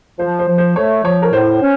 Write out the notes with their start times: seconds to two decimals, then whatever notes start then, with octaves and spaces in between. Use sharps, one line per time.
0.19 F3 C5
0.39 C5
0.48 F3
0.58 C5
0.76 A3 C#5
1.04 F3 C#5
1.22 A#4
1.32 A2 C5
1.61 C#4